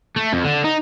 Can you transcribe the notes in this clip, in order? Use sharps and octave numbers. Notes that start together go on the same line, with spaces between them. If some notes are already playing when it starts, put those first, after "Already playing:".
A3
F2
D3
D#4